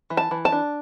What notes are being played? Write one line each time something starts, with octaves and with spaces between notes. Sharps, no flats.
E3
A5
E3
A5
D4